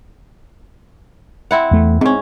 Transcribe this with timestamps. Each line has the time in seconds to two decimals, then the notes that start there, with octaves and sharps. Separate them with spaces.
1.51 C4 E4 F#5
1.71 E2 A3
2.01 G#2 C4 C#4